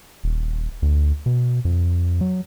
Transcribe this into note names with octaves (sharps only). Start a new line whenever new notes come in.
D#1
D2
B2
F2
F#3